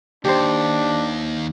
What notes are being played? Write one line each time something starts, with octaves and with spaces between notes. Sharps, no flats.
D#2 D4 G4 C5